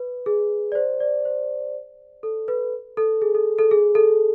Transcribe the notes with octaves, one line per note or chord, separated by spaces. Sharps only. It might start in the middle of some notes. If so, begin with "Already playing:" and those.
Already playing: B4
G#4
D5
C5
D5
C5
A4
B4
A4
G#4
A4
A4
G#4
A4